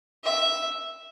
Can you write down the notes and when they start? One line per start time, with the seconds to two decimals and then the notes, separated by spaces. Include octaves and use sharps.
0.24 E5